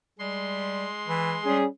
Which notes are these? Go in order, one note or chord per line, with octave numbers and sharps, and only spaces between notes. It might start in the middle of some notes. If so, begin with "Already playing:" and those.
G3 G#3 C6
E3
G3 C#4 G#4